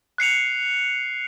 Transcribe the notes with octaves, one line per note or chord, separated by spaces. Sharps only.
F#6 C7 C#7 F7